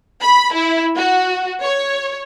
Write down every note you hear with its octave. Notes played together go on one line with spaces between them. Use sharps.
B5
E4
F#4
C#5